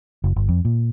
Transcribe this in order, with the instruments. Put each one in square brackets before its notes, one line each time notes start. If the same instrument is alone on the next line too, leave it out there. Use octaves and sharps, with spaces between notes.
[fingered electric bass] F#1
G1
F2
A#2